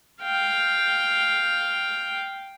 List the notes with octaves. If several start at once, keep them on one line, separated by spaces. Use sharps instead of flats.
F5 G5